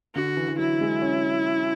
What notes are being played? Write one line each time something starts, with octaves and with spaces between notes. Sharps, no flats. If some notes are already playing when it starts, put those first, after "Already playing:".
D3 F#4
E3
E3
F#3 E4
G#3
C#4